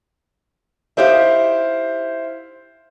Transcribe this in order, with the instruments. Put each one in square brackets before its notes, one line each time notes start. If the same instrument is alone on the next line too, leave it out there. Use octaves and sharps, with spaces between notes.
[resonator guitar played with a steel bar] D#4 G4 E5 [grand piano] E4 C5 F5